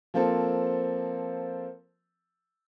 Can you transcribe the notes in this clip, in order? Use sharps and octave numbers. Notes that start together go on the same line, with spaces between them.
F3 A#3 C4 A4